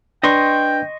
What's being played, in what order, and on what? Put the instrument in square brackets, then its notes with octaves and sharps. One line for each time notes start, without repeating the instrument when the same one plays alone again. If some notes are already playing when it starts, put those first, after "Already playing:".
[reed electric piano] D4 B4 [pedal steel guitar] D#5 C6 C#6 [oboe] G5